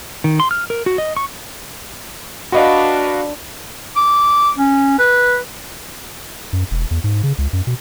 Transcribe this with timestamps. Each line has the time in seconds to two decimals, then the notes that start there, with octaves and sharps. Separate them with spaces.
0.24 D#3
0.40 C6
0.51 F6
0.70 A#4
0.86 F#4
0.98 D#5
1.17 C#6
2.52 D4 F#4 B4 D5 D#5 F5 B5
3.96 D6
4.58 C#4
4.99 B4
6.53 F#2
6.71 E1
6.91 E2
7.04 G#2
7.23 C#3
7.38 C#2
7.53 F#2
7.67 B2